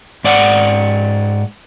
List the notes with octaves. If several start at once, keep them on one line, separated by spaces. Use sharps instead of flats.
G#2 D5 F#5